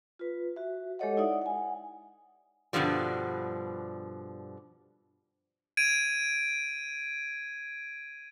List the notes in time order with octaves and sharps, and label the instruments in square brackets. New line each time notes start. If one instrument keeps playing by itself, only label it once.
[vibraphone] F4 B4
F#4 E5
G#3 G4 A4 C#5 D#5 F#5
D#4 E4 D5 E5 F#5 D#6
F#5 G#5
[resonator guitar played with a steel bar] G2 B2 D3 F3 G3
[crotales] G#6 D7 D#7